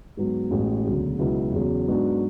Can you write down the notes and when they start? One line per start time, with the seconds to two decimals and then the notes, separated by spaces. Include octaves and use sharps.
0.17 G#2 F#3 B3
0.50 A1 A2 G#3 B3 F#4
0.85 E1 D2 C#3 F#3
1.19 C#2 B2 F#3 B3 E4
1.53 E2 C#3 F#3
1.88 G#2 F#3 B3 D4 F#4